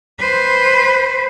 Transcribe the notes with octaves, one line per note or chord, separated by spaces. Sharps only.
B4 C5